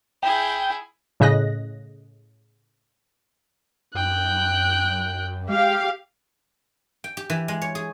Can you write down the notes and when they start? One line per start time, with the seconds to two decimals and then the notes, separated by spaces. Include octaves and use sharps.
0.23 E4 G#4 G5
1.20 A2 C#3 D#5 F#6 A#6
3.95 F#2 G5 F#6
5.49 G#3 G4 F5
7.04 G5
7.17 G4
7.30 E3
7.48 G#3
7.62 C#5
7.75 G#4